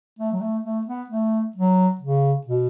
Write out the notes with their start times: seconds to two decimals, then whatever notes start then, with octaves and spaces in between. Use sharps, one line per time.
0.19 A3
0.33 F#3
0.41 A3
0.64 A3
0.87 B3
1.10 A3
1.56 F#3
2.01 C#3
2.47 B2